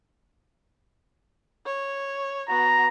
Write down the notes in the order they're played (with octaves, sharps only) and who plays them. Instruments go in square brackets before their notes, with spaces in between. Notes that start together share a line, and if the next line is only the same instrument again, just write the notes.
[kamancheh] C#5
[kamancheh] B3 F#4 [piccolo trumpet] A#5